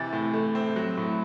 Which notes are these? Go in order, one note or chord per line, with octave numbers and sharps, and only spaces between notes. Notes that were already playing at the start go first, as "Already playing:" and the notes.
Already playing: C3 E3 A6
A2
A3
C4
F#3
A2